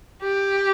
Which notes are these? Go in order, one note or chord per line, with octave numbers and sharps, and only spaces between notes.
G4